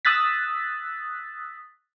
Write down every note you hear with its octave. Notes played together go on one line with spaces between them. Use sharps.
D#6 E6 F#6 A6 B6